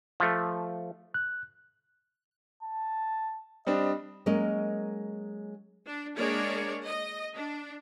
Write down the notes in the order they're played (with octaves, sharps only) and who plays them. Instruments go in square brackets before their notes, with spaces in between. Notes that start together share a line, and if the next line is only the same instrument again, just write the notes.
[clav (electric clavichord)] F3 A3
[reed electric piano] F#6
[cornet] A5
[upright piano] G3 C4 D4 [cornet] D#5
[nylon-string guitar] F#3 G#3 A#3 C#4 A#4 D#5
[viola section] D4
G#3 A#3 D4 A#4 C#5 D5
D#5
D4